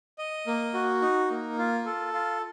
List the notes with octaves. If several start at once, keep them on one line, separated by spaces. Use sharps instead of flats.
D#5
A#3
F#4
D#4
A#3
F4
A4
F4